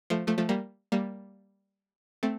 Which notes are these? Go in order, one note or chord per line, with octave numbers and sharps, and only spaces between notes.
F3 A3
F3 A3
F3 A3
G3 A#3
G3 A#3
A3 C4